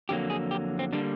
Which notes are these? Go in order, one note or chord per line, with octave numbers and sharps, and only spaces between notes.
F2 D3 F#3 A#3 G4
G#4
G4
C4
D3 G3 A#3 D4